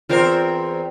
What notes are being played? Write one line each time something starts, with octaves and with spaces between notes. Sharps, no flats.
E2 C4 F4 A#4 F5